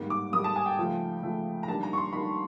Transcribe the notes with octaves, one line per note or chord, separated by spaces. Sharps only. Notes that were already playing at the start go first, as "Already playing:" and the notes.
Already playing: G#2 D#3 G3 A#3
D6
G#2 D#3 G3 A#3 D#6
A5
G#5
G5
C#3 F3 A3
C#3 F3 A3
A#5
D#3 G3 A#3 D4 A5
A#5
C#6
C6
D#3 G3 A#3 D4 B5